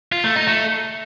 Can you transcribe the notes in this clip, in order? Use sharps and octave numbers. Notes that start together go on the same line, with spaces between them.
F4
A3
D#4
A3